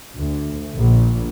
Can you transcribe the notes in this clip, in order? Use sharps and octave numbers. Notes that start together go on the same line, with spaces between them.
D2
A#1